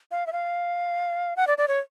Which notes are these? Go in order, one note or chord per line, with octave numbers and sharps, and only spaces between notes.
F5
E5
F5
F#5
D5
D5
C#5